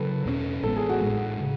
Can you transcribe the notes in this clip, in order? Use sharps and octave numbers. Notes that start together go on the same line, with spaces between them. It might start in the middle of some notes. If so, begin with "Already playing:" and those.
Already playing: C#3 F#3 A4 B4
E2 B2 A3 C#4
A1 A2 G#3 B3 A4
G#4
F#4
A1 A2 G#3
C#3